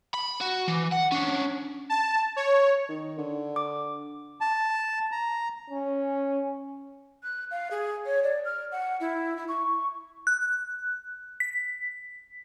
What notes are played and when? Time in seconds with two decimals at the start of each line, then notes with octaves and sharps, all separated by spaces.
0.14 B5
0.41 F#4
0.68 E3
0.92 F#5
1.12 C#4 D4
1.90 A5
2.36 C#5
2.89 D#3
3.18 D3
3.56 D6
4.41 A5
5.12 A#5
5.70 C#4
7.22 F#6
7.50 F5
7.70 G#4
8.05 C#5
8.23 D5
8.44 F6
8.71 F#5
9.00 E4
9.36 E4
9.48 C#6
10.27 F#6
11.40 B6